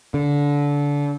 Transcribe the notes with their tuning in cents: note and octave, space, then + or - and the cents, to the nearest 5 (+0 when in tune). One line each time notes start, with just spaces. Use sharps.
D3 -25